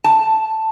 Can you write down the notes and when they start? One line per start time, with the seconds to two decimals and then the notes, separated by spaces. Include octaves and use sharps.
0.04 A5